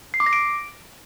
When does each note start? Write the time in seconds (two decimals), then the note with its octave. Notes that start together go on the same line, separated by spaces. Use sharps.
0.14 C7
0.20 D6
0.26 A#6
0.33 D7